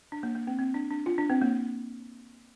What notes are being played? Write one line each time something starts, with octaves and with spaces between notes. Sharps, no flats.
D4
A#3
A#3
C4
C4
D4
D4
F4
D4
C4
A#3